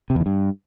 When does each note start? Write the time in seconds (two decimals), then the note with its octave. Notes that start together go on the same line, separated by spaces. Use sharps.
0.10 C3
0.15 E2
0.21 D#3
0.26 G2